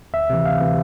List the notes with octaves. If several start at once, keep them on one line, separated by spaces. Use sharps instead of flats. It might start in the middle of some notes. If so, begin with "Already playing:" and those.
D2 E5
C3 E3
D2 F5
C3 E3